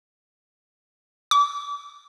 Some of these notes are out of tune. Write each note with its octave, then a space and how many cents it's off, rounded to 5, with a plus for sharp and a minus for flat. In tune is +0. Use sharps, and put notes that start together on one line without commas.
D6 -35